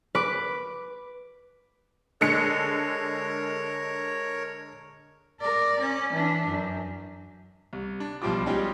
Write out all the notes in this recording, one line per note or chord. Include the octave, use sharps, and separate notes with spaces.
B4 D6
D3 G#3 A#4 C#5 C#7
A#4 D5
C#4
E3 D4
F#2
C2
D4
B1 F3 G3 F4 D6
G3 G#3 C#4 D#4 F4 G4